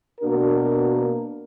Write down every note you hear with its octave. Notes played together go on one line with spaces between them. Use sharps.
B2 A#3 D4 F#4 A#4